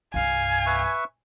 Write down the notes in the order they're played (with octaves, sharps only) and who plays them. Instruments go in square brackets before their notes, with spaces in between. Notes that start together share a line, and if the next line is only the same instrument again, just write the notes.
[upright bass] C2 G2 [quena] F5 [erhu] G#5
[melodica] B4 E5 C#6